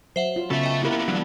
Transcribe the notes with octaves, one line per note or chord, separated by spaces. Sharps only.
F#3 C5 E5 F#5
F4
C#3 B3 F#4 A4 E5
D#5 G5
A#3 B3 E4 G4 A#4
E3 F#3 G3 D4